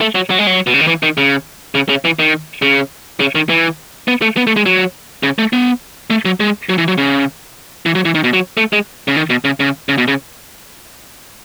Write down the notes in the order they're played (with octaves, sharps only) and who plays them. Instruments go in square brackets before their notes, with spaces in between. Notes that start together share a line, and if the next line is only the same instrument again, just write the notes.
[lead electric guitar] A3
F#3
F#3
G#3
F#3
B2
C#3
D#3
E3
D#3
C#3
C#3
C#3
E3
D#3
C#3
C#3
D#3
E3
B3
A3
B3
A3
G#3
F#3
C#3
A3
B3
A3
F#3
G#3
F#3
E3
F#3
C#3
E3
F#3
E3
D#3
B2
F#3
A3
G#3
C#3
D#3
B2
C#3
C#3
C#3
B2
C#3